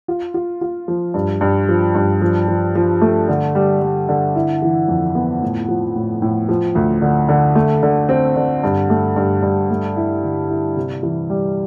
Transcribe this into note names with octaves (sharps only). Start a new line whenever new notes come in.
F4
F4
F4
F3
G2
G2
F3
G2
F3
F3
F3
A3
D3
G3
G3
D3
E4
E3
F2
B3
A2
F3
A2
A2
F3
D2
D3
D3
A3
D3
C4
D3
G2
A3
G2
G2
A3
E4
D3
E4
C3
E3
G3